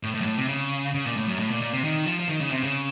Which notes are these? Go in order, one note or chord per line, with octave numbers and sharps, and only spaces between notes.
A2
A2
F#2
A2
C3
C#3
C#3
A#2
A2
F#2
A2
A#2
A#2
C3
D#3
F3
F3
D#3
C#3
C3
C#3